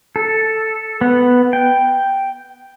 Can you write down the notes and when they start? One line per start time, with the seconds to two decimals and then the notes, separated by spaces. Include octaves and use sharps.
0.16 A4
1.01 B3
1.53 G5